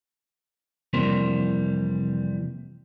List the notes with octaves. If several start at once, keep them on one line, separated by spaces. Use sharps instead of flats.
F2 C3 E3 G3 A#3 C5